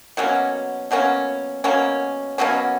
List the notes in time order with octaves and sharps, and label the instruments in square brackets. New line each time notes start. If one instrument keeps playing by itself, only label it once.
[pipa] B2 F#3 A#3 C#4
B2 F#3 A#3 C#4
B2 F#3 A#3 C#4
B2 F#3 A#3 C#4